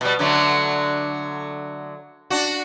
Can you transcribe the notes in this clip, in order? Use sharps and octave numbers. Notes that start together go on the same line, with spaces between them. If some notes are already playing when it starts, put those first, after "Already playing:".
B2 G3
D3 F#3 A3
D4 F#4